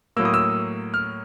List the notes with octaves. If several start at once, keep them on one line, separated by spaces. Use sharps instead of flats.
A2 F#3 A#3 E6
D#6
E6
F6